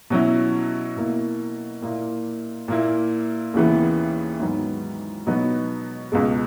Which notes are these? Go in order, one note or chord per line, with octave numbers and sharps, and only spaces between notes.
B2 F#3 C#4 E4
B2 A#3 E4
A#2 A#3 E4
A#2 A#3 E4
D#2 C#3 E3 B3
G#2 D#3 F#3 B3
B2 F#3 B3 D#4
C#2 B2 G#3